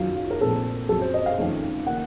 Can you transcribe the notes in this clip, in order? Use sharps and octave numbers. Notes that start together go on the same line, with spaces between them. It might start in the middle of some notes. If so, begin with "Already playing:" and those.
Already playing: F#2 D#3 F#3 F4
F4
A#4
A#1 A#2 A3 C4 A4
F#2 F3 C4 A4
C5
D#5
F5
F2 D#3 A3 C#4
D#3 A#3 F#5